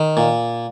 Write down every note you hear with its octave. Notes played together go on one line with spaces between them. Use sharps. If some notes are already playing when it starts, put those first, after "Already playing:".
Already playing: D#3
A#2